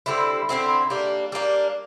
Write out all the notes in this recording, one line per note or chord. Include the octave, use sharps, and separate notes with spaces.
D3 G3 C4 E4
D3 G3 C4 E4
G3 A#3 D4
G3 A#3 D4